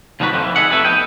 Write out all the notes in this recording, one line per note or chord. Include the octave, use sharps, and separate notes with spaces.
D#2 F3 G3 D#4 F#4 B4
F2 A2 F3 G3
E3
F2 D#4 G#4 E5 F#5
F2 G3 A3 B4 E5
B3 D#5 G5